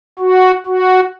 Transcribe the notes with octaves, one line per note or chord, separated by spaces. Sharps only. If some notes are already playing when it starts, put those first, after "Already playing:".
F#4
F#4